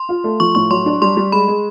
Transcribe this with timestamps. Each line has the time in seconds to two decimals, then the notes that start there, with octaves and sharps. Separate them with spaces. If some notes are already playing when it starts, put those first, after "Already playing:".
Already playing: C6
0.09 F4
0.24 A3
0.40 F3 C#6
0.55 A2 C#6
0.71 F#3 C6
0.86 D4
1.02 G3 C6
1.17 G3
1.32 G#3 B5
1.48 G#3